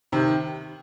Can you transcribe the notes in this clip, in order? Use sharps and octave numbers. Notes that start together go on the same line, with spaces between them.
C3 D#3